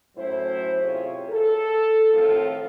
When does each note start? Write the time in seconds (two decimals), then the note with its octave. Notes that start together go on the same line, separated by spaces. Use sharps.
0.17 F#2 A2 E4 C5
0.84 C3 F4 G#4 C#5
1.30 A4
2.14 A2 D#3 F3 A3 C4 F4